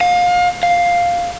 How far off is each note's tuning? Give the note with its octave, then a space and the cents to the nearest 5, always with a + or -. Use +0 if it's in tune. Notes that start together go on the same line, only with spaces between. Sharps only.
F5 +30
F5 +5